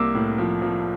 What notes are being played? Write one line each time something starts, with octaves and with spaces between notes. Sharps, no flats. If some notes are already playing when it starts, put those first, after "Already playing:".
Already playing: C2 A#3 D6 E6
A2
F3
F3